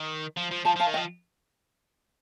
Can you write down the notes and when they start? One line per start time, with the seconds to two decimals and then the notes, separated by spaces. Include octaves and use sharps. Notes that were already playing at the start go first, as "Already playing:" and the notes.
Already playing: D#3
0.37 F3
0.51 F3
0.65 F3 F5 A5
0.76 F3 F5 A5
0.87 D#3
0.94 D#5 G5
0.97 F3